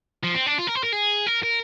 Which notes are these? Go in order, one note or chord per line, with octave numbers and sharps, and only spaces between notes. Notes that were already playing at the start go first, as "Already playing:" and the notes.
F3
C4
D4
F4
A#4
C5
A#4
G#4
A#4
A#4